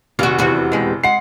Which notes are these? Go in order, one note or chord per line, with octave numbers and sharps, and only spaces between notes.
F1 D#3 F4 F#4
E2 C3 F#4
B2 G#3 G4
G#3 F#5 C7